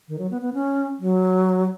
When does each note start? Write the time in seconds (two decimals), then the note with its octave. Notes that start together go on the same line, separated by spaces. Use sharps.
0.08 D#3
0.19 F#3
0.31 B3
0.42 B3
0.54 C#4
1.00 F#3